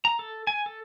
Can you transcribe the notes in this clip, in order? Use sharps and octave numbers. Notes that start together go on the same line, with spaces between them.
A#5
A4
G#5
A4